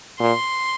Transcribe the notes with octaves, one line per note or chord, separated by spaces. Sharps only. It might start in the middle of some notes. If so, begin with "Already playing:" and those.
A#2 C6